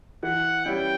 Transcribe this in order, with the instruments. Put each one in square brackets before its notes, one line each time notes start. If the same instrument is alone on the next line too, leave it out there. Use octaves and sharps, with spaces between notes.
[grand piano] E3 [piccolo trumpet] F#5
[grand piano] G3 C#4 E4 [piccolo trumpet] G5